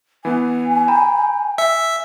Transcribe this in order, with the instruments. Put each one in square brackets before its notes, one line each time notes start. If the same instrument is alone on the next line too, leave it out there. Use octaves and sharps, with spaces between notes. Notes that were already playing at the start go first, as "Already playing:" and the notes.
[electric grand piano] E3 B3 [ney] G#5
[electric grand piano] G5 [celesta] A#5 B5
[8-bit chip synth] E5 [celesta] G#5